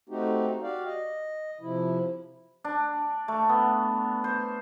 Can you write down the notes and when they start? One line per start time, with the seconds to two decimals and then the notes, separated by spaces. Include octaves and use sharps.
0.09 A3 C4 D#4 F#4 G4
0.62 F#4 G4 D5 F5
0.85 D#5
1.61 C3 F3 E4
2.64 D4
3.28 A3
3.49 B3
4.24 C5